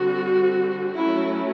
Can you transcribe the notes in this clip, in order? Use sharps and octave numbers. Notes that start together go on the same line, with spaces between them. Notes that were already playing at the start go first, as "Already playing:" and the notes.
Already playing: D3 G3 C4 F#4
F#3 A3 C#4 E4